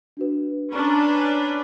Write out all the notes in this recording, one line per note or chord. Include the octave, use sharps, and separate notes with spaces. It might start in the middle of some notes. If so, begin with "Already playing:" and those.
D4 F#4 B4
C#4 D4 B4 A#5 C#6 F6